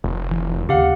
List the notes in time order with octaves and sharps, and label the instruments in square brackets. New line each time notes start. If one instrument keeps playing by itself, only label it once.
[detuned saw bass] F1
[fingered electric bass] E3
[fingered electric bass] D#2 C#3 [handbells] G4 F5 F#5